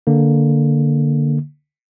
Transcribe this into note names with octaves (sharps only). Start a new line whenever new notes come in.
D3 A#3